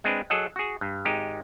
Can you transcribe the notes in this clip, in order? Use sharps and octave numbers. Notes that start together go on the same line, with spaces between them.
G#3 C4 D4 B4
F#3 G#4 A4 D#5 F#5
F#4 G#4
G2
G#1 G#3 D#4 G4